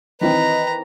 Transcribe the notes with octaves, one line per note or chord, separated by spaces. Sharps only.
D#3 E3 C4 B4 D#5 A#5